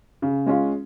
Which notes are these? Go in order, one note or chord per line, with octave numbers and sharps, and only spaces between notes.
C#3
G#3 C#4 F4